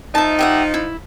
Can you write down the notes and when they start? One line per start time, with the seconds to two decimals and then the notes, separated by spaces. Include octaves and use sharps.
0.15 F3 D#4 E5 A5
0.39 G4 E5 F#5
0.74 E4